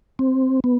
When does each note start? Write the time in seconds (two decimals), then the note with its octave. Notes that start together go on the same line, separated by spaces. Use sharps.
0.19 C4
0.64 B3